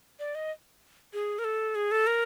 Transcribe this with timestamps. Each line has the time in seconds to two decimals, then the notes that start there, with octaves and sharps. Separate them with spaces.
0.20 D5
0.35 D#5
1.13 G#4
1.39 A#4
1.44 A4
1.75 G#4
1.91 A4
2.07 A#4